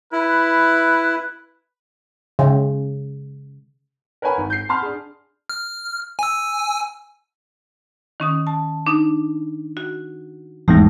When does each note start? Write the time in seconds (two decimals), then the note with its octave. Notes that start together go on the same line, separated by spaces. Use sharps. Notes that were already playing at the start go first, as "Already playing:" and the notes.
0.12 E4 B4
2.39 C#3
4.22 A#4 B4 C#5 F#5 G#5 B5
4.38 G#1
4.50 G6 C7
4.69 F#5 A5 B5 C6 F6
4.82 D4 G#4
5.50 F6
6.19 G#5 E6
8.20 D#3 C#4 D#6
8.47 A5
8.87 D4 D#4
9.77 F#4
10.68 G#1 E2 G#2 G3 A3